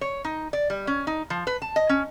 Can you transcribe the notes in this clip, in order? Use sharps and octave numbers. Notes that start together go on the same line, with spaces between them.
C#5
D#4
D5
G3
C#4
D#4
F3
B4
A5
D#5
C#4